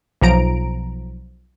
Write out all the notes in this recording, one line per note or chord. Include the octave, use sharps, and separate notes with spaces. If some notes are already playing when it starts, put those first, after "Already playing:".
B1 F3 A#5 D7